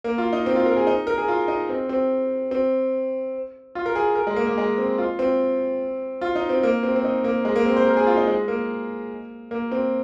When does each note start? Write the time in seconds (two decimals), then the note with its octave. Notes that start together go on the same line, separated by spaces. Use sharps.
0.04 A#3
0.18 F4
0.33 D#4
0.46 C4
0.56 F4
0.66 A#4
0.77 G#4
0.87 D#4
1.07 A#4
1.18 G#4
1.28 F4
1.48 D#4
1.69 C4
1.89 C4
2.51 C4
3.75 F4
3.86 A#4
3.95 G#4
4.15 A#4
4.27 G#3
4.36 A#3
4.47 A#3
4.58 G#3
4.78 C4
4.98 F4
5.19 C4
6.21 F4
6.35 D#4
6.49 C4
6.63 A#3
6.83 C4
6.96 C4
7.04 D#4
7.24 A#3
7.45 G#3
7.56 A#3
7.65 C4
7.77 C5
7.87 A#4
7.97 G#4
8.07 F4
8.17 D#4
8.27 G#3
8.48 A#3
9.51 A#3
9.72 C4